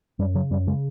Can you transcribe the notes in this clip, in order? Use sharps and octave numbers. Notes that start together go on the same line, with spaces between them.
F#2 G3
C#3 F#3
F#2 G3
C#3 G#3